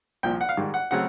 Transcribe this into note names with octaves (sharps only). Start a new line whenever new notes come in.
C2 A#2 F3 G5
F#5
F5
G#2 D#3 G3
F#5
C#3 F#3 A3 C4 F#5